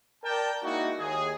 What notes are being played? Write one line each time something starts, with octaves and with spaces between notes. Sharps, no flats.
A#4 D5 G5 A5
G#3 A#3 D#4 E4 F#4
D#2 G#4